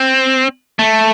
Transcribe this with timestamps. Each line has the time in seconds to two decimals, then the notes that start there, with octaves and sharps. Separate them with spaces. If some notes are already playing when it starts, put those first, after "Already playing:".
Already playing: C4
0.79 A3